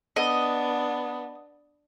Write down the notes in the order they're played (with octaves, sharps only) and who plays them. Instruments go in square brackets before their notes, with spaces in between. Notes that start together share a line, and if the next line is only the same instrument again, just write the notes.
[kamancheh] B3 D4 [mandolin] D#5